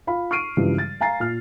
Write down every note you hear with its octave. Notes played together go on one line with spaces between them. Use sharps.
F4 F5 B5
C#6 F6 C7 D7 D#7
G2 C#3 E3 F3 G3 G#3
A6
F5 G#5 A#5 A6 C7
A#2 F6